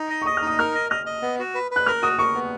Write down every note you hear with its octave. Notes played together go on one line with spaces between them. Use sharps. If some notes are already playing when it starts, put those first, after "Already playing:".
Already playing: D#4
D#5
C#6
D#5 D#6
F6
D#4
D#6
A#4 F6
D#5
D#5 F6
D#5
B3
F#4
B4
B4 F#6
A#4 F6
F#4 D#6
A#4 C#6
B3